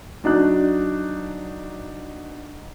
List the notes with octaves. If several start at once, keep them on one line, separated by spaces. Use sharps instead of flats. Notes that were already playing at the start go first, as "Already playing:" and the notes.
F#3 D4 D#4 F#6